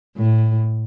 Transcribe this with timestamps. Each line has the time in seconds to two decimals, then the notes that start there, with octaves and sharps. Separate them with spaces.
0.16 A2